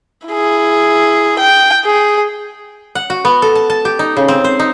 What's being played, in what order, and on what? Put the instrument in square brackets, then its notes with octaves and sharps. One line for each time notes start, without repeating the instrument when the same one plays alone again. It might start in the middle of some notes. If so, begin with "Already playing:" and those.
[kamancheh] E4 G#4
G5
G#4
[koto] F#5
F#4
B3
A4
A5
A5
G4
D#4
C#3
C4
C5
D#4